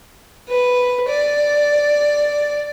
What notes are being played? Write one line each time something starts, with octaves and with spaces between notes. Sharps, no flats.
B4
D5